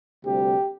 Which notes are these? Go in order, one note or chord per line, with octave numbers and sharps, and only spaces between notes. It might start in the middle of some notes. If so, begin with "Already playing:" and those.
D2 C3 G3 G4